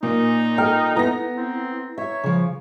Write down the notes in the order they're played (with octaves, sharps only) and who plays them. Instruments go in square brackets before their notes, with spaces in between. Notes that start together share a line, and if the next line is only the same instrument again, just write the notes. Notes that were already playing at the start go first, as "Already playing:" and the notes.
[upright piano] A#2 A#3 [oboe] D#4
[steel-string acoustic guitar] A4 G5 [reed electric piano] D#5 A#5 F6
[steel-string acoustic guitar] B3 [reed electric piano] E4 [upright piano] A#5 A#6
[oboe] C4
[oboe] C#5 [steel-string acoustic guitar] E5
[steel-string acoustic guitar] C#3 F3